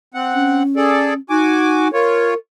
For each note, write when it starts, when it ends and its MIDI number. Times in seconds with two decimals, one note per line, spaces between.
0.14 0.63 60
0.14 0.63 78
0.34 1.18 61
0.76 1.14 68
0.76 1.14 69
0.76 1.14 74
1.30 1.93 63
1.30 1.88 66
1.30 1.88 80
1.30 1.88 86
1.93 2.34 65
1.93 2.36 70
1.93 2.34 73